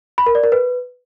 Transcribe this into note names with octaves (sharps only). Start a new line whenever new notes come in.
B5
A#4
D5
A#4
B4